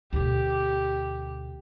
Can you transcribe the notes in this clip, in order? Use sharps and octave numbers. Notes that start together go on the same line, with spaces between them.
D2 B2 G4